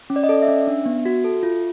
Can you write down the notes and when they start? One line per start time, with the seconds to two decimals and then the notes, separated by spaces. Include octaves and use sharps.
0.10 C#4
0.16 D5
0.24 D#5
0.29 A4 D5
0.42 E5
0.48 C#4
0.67 D4
0.86 B3
1.05 F#4
1.24 A4
1.43 F4